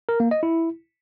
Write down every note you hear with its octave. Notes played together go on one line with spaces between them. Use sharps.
A#4
A#3
D#5
E4